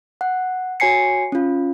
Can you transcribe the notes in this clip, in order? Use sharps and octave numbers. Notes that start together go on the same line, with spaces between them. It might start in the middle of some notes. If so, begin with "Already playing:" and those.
F#5
F#4 C#5 G#5 C7 C#7
C#4 F4